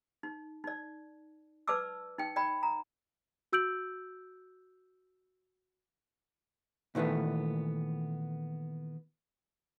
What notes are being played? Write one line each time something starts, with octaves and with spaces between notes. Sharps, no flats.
D#4
D#4 D5
B4 D5 A5 D6 E6
D#4 G5
D5 G5 B5
A#5
F#4 E6 G6 D7 F#7
A#2 D#3 E3 A3 B3